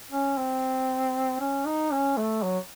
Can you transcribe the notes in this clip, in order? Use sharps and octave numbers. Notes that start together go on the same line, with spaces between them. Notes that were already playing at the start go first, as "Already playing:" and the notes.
C#4
C4
C#4
D#4
C#4
A3
F#3